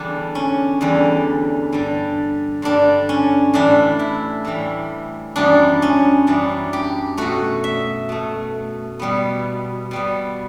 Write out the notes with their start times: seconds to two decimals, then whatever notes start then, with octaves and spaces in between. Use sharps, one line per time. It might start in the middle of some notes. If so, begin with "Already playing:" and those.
Already playing: E2 D3 G3 D4
0.35 C#4
0.81 E2 D3 G3
1.72 G2 D3 G3
2.62 G2 D3 G3 D4
3.09 C#4
3.54 A2 E3 G3 D4
3.99 E4
4.45 A2 E3 G3
5.36 F#2 E3 G3 B3 D4
5.82 C#4
6.27 F#2 E3 G3 B3 D4
6.73 G4
7.18 B2 A3 F#4
7.64 E5
8.09 B2 A3
8.99 B2 G3 B3
9.91 B2 G3 B3